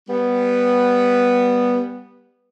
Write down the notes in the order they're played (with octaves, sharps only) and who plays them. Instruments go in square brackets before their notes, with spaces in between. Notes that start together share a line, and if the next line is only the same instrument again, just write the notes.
[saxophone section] G3 B3